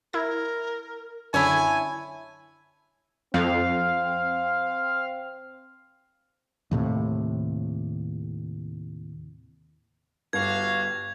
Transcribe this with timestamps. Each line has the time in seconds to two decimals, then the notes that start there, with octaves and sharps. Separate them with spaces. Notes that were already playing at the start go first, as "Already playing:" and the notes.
0.13 E4 A#4 G#6
1.34 F#2 D3 E4 C#5 G#5 A5
3.34 F2 C4 F5
6.71 D#2 A2 C3
10.33 G1 F#4 G4 F5 G#6